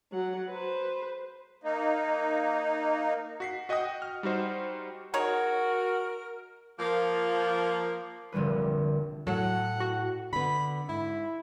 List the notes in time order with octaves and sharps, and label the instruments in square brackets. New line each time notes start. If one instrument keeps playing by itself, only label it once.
[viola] F#3 F#5
B4 C5
[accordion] A#3 D#4
[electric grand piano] F#4 B6 C7
F#4 D#5 F#5 G5 D#6
F6
G3 D#4 F#4 C5
[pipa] D#4 G#4 C#5 [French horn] F#4 [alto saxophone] A#4
[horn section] F3 A#3
[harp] F1 A#1 D3 G3 B4
[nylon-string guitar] A2 A4 [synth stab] F#3 [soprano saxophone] F#5
[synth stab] F#4
[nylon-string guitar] D3 B3 [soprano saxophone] B5
[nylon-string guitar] G#2 [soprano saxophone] E4